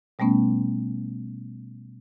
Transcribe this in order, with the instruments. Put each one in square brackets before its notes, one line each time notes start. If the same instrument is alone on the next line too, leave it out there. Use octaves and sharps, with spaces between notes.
[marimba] B2 G3 A3 B3 C#4